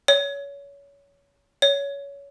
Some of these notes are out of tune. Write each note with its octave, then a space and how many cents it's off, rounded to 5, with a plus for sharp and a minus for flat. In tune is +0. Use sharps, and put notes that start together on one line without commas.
C#5 +25
C#5 +20